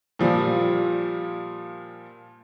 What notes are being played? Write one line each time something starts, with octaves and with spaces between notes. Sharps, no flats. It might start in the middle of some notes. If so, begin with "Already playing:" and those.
A#2 F3 G3